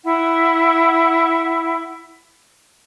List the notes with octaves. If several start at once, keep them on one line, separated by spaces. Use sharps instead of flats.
E4 F#5